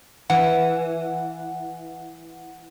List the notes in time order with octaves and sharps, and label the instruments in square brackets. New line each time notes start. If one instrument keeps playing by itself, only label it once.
[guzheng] E3 [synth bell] F#5